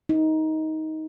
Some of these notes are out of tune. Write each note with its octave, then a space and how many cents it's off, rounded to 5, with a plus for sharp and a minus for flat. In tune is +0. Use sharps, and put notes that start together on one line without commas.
D#4 +15